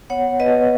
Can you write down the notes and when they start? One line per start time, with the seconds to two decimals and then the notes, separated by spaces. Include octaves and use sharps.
0.10 B3 C#5 F#5
0.40 B3 B4 D#5